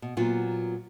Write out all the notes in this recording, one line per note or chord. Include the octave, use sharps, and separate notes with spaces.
B2
A#2 F#3 B3 F4